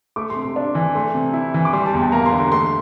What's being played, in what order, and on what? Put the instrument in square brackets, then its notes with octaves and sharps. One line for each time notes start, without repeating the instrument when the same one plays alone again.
[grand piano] A3 [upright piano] D6
[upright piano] C6
[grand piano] C3
[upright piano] C6
[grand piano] D4
E3
[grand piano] A3 [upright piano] C6
[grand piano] C3
E4
E3
[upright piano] D6
[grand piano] G3 [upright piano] C6
[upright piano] A5
[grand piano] E2
[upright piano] G5
[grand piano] A#3 [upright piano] A#5
[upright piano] C6
[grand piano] D3
[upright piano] C6
[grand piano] A3 [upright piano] C6